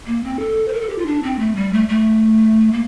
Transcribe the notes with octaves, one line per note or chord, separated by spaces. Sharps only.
A#3
C4
A4
C5
A#4
A4
G4
F4
D4
C4
A3
G3
A3
A3
A#3